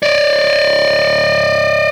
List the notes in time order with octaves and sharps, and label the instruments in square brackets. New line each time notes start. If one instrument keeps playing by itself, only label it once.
[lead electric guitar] D5 D#5